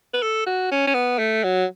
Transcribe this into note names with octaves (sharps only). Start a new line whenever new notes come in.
B4
A4
F#4
C#4
C#4
B3
A3
F#3